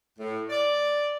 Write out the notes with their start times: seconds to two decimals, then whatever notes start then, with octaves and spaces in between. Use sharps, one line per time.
0.19 A2
0.50 D5